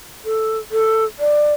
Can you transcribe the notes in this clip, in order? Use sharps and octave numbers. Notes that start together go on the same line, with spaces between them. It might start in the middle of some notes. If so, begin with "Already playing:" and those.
A4
A4
D5